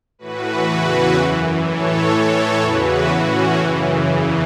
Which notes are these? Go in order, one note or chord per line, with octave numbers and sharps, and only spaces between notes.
A2 E3 F#4 B4
E2 C#3 E3 F#4 B4
F#2 E3
A2 E3 A4 C#5
A2 E3 A4 C#5
E2 C#3 E3 F#4 B4
A2 E3 C#4 F#4
F#2 C#3 E3
E2 C#3 E3